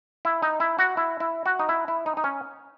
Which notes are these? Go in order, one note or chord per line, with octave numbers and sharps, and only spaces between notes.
E4
D#4
E4
F#4
E4
E4
F#4
D#4
E4
E4
D#4
D#4
C#4